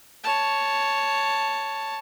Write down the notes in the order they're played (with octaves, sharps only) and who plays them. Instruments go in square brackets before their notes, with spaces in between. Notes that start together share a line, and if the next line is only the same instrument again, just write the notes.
[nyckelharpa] C#5 A5